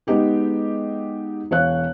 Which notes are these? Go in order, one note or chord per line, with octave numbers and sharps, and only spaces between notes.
G#3 B3 D#4 G4 G#4
E1 C#5 F5 F#6